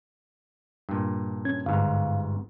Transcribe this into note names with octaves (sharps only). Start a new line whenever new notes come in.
G2 A#2
C#4 G#6
G1 G#2 F5